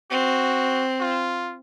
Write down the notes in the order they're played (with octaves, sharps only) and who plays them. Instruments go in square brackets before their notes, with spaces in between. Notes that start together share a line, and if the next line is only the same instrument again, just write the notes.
[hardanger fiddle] C4 [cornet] F#4
[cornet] F4